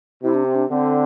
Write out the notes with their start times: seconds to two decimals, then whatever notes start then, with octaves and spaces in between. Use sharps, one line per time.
0.23 C3 E4
0.34 D4
0.45 C4
0.55 D4
0.70 D3 C4